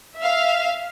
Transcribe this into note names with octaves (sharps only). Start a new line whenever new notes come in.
E5 F5